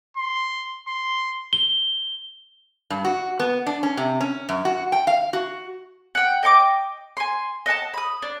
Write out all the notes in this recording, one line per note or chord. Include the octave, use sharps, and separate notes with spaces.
C6
C6
G7
G2
F#4
B3
D4
C#4
C3
C#4
F#2
F#4
G5
F5
F#4
F#5 G5
D#5 G5 C#6 D6
G#5 C6
D#5 F#5 G#5 A5
B5 D#6
D4